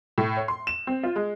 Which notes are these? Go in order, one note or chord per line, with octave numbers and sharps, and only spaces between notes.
A2
C#5
C6
E7
C4
F4
G#3